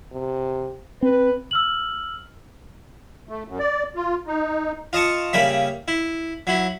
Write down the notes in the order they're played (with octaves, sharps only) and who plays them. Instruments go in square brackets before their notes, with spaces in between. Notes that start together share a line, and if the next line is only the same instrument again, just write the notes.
[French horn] C3
[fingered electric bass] C4 [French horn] B4
[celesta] E6 F6 F#7
[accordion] A3
F#2
D5
F4
D#4
[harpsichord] F4 D#5 A5 C#6
C#3 G3 A#3 E5
E4
F#3 E4